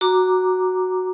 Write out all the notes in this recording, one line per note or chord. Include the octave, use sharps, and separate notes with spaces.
F#4 A#5 D6